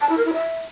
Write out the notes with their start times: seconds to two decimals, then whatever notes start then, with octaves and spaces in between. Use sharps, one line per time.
0.01 A5
0.09 E4
0.17 A#4
0.25 E4
0.34 E5